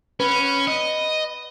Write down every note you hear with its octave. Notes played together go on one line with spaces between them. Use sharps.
C#4 B4
D#5